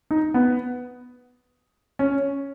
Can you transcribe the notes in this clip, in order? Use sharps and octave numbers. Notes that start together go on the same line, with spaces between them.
D#4
B3
C#4